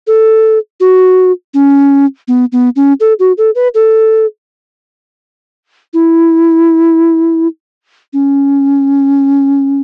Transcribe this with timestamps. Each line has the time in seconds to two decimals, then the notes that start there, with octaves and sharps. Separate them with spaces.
0.07 A4
0.80 F#4
1.54 C#4
2.28 B3
2.52 B3
2.76 C#4
3.00 A4
3.19 F#4
3.38 A4
3.55 B4
3.75 A4
5.94 E4
8.13 C#4